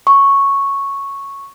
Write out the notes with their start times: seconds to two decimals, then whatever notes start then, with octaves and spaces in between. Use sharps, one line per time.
0.07 C#6